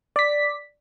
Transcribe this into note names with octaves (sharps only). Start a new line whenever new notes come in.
D5 B6